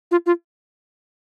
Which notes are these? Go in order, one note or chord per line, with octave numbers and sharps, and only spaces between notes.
F4
F4